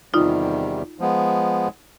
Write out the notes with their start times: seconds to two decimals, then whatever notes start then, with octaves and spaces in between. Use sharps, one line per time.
0.14 E2 C3 D#3 G3 D#4 F4
0.99 F3 G#3 B3